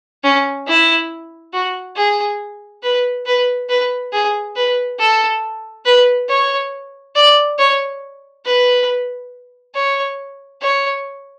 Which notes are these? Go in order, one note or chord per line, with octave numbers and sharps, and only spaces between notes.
C#4
E4
F#4
G#4
B4
B4
B4
G#4
B4
A4
B4
C#5
D5
C#5
B4
C#5
C#5